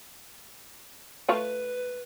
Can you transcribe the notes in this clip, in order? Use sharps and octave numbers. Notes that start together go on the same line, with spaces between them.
A3 F4 B4 C#5